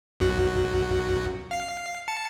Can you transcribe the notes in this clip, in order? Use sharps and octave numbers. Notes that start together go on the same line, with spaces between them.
B1 F#2 F#4
F5 C7
A5 C#7